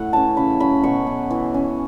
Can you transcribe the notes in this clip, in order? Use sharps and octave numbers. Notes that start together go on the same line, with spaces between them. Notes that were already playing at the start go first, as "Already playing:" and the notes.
Already playing: A2 F#5
E3 C#4 A5
C#3 B5
F#3 C#4 B5
B2 C#6
B3
E3
C#4